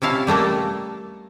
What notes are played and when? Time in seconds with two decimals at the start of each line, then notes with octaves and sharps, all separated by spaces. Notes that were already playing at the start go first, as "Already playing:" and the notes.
0.02 C3 C#4 E4 F5 A5
0.27 G3 A3 A#3 A4